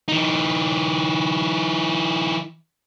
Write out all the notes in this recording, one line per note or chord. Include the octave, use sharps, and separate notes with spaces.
E3 D#4